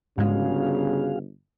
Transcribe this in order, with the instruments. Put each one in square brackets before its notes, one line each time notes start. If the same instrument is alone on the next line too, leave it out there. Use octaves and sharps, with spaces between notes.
[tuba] G1 [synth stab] G#2 G#3 [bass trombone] C#3 [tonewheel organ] F#4 G#4 F5